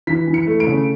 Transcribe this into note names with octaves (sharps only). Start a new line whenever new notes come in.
E3 B6
E3
C#7
A3
D7
C#3